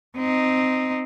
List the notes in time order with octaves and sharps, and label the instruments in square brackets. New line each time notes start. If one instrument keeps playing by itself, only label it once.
[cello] C4 D#4